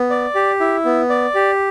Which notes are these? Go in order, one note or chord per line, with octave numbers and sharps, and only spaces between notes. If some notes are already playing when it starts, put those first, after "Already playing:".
Already playing: B3
D5
G4
E4
B3
D5
G4